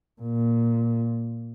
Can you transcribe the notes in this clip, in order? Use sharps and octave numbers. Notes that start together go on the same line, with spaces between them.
A#2